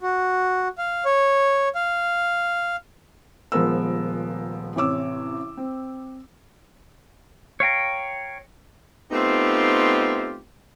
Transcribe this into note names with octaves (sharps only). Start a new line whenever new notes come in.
F#4
F5
C#5
F5
D#1 F3 G#3 B3 A#4 E6
A1 C3 C#5 D6 E6
C4
C#5 F5 G5 A#5
A3 B3 C4 D#4 F4 G4